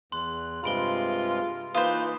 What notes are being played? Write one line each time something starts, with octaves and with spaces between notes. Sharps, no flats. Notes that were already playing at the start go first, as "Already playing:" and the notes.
E2 C6 F#6
G2 C3 G#3 F4 B5 D7 G7
E3 A#3 D#4 F4 B4 C5 D#6